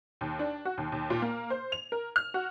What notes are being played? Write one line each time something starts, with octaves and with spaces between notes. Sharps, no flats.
D#2
D4
F#4
D#2
D#2
A#2
A#3
C5
F7
A#4
F6
F#4